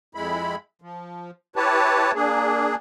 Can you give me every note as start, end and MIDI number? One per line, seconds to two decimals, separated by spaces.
0.15 0.55 41
0.15 0.55 56
0.15 0.55 64
0.15 0.55 83
0.82 1.31 53
1.56 2.12 64
1.56 2.12 67
1.56 2.12 71
1.56 2.12 73
1.56 2.12 81
2.15 2.75 58
2.15 2.75 62
2.15 2.75 68